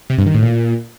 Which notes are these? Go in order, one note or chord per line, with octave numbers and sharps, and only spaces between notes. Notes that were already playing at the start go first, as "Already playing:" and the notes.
C3
G2
D#3
A2
A#2